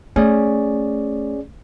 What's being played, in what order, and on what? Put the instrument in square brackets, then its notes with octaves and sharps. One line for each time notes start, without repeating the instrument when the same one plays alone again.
[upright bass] A3 [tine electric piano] C#4 G#4 D5